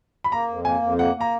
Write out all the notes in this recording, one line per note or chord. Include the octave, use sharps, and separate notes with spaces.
B5
A#3 A#5
F2
A#3 G#5
F2
A#3 F#5
A#3 A#5